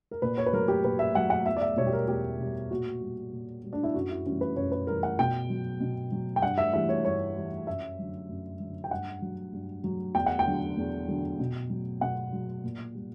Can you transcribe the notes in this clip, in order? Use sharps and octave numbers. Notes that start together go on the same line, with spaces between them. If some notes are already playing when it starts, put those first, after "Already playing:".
A#4
A#2 B4
C#5
B4
F#3 A#4
G4
A#2 B4
E5
F#3 F#5
F#5
E2 E5
D5
E5
B2 G3 C#5
G4
A#4
E2 G4
B2 G3
A#2 F#4
G3
A#2
G3
D4
E4
F#2 F#4
E4
E3 G3 C#4
B4
F#2 C#5
B4
E3 G3 A#4
F#5
B2 G5
F#3
B2
F#3
G5
G2 F#5
E5
E3 G3 E5
C#5
G2 C#5
E3 G3
F#2 E5
D3 F#3
F#2
D3 F#3
G5
G2 F#5
F#3
G2
F#3
E2 G5
F#5
G5
D3 F#3
E2
D3 F#3
B2
F#3
B2 F#5
F#3
A#2
G3